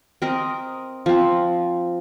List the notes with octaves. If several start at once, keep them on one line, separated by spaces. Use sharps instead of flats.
C4 A#4 D#5
F3 C4